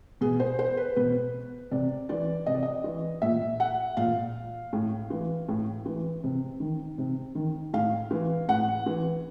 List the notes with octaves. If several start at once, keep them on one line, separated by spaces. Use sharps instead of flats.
B2 G#4
C5
C5
B4
B2 B4
C3 D5
E3 D5
C3 D#5
D5
D#5
E3
A#2 E5
F#5
A#2 F5
A2
E3
A2
E3
C3
D#3
C3
D#3
A2 F5
E3
A2 F#5
E3